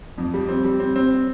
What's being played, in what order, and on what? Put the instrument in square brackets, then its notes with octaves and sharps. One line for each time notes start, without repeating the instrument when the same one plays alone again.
[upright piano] F2
G3
C4
G3
C4
C4